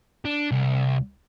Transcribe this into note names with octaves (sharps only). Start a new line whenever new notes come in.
D4
C2